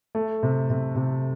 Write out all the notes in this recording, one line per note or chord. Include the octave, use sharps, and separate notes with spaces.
A3
C3
C3
C3